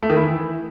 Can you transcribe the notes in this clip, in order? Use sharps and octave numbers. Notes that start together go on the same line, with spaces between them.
A3
D#3
E4
E3